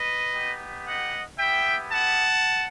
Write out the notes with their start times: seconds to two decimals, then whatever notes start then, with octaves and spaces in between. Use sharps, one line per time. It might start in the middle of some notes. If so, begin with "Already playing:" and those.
Already playing: B4 D#5
0.32 B3 D#4 G4
0.85 D#5 F#5
1.38 B3 E4 G4 E5 G5
1.92 F#5 A5